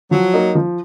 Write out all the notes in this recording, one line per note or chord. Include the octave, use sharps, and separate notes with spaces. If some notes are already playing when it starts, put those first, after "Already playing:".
F3 F#3
A#3 D#4
F3